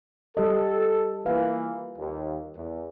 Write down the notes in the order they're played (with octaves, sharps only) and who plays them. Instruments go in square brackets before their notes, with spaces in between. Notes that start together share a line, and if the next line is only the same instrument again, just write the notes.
[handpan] G3 G4 D#5 [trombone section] A4
[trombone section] E3 A#3 [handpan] F4 B4 F5
[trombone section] D#2
E2